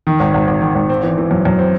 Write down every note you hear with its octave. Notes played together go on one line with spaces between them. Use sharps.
D#3
G#1
G#1
G#1
D#3
G#1
C4
E3
E3
F#2
F#2
C4